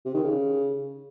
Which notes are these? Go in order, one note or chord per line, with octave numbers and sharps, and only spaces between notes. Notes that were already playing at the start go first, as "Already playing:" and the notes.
C3
D#3
C#3